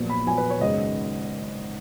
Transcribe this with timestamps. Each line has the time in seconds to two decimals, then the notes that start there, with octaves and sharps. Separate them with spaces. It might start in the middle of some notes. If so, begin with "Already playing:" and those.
Already playing: A#1 A#2 F#3 B3
0.10 B5
0.27 A#1 A#2 F#3 B3 G#5
0.38 B4
0.50 C#5
0.60 G#1 F#2 C#3 G#3 D#5